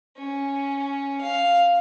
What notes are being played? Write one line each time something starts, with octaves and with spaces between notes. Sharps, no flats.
C#4
F5